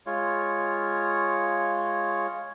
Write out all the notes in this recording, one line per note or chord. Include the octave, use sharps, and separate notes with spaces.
G#3 F4 C#5